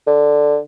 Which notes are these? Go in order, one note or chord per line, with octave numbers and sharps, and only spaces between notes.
D3